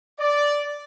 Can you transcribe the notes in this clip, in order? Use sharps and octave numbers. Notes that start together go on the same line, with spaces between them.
D5